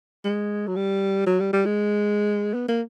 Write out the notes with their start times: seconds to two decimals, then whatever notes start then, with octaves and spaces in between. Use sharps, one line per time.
0.24 G#3
0.67 F#3
0.76 G3
1.27 F#3
1.40 G3
1.53 G3
1.66 G#3
2.54 B3
2.68 A#3